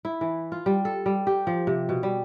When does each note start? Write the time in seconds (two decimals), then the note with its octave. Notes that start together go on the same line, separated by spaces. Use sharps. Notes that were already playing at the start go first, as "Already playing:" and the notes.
0.05 E4
0.21 E3
0.52 F4
0.66 G3
0.85 A4
1.06 G3
1.27 G4
1.47 F3
1.67 C3
1.89 B2
2.03 G3